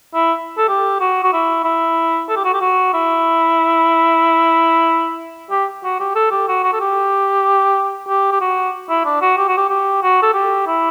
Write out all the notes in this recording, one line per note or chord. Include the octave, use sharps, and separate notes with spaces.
E4
A4
G4
F#4
F#4
E4
E4
A4
G4
F#4
G4
F#4
E4
G4
F#4
G4
A4
G4
F#4
F#4
A4
G4
G4
G4
F#4
E4
D4
F#4
G4
F#4
G4
G4
F#4
A4
G4
E4